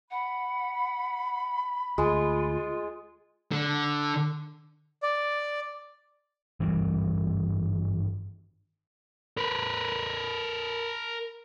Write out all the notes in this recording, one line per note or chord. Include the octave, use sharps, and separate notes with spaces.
F#5 B5
D2 G#3 F4
D3
D5
G#1 G2 E3 G3
A#4 B4